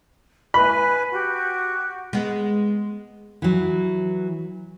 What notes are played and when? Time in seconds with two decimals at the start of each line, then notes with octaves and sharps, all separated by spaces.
0.54 B4 G#5 B5
1.12 F#4 G4
2.13 G#3 B3
3.42 E3 F#3